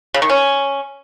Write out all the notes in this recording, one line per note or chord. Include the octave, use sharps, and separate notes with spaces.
C#3
D#3
C#4